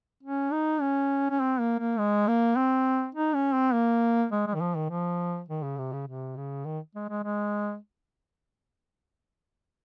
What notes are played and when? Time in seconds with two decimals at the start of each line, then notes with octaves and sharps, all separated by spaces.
0.23 C#4
0.52 D#4
0.81 C#4
1.31 C#4
1.40 C4
1.60 A#3
1.79 A#3
1.99 G#3
2.28 A#3
2.56 C4
3.15 D#4
3.35 C#4
3.54 C4
3.73 A#3
4.32 G#3
4.47 G#3
4.55 D#3
4.61 F3
4.76 D#3
4.90 F3
5.49 D#3
5.63 C#3
5.78 C3
5.93 C#3
6.08 C3
6.37 C#3
6.66 D#3
6.95 G#3
7.09 G#3
7.24 G#3